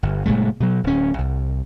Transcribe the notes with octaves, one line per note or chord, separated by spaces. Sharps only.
G1
F#1 A#2 G#3 A3
B2 F#3
D1 C#4
C2